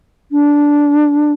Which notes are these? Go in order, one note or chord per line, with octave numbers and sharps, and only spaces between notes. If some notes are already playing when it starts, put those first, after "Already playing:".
D4